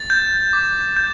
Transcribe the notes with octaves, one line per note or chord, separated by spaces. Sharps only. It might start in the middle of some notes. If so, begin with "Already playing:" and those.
Already playing: A6
G6
D6
G6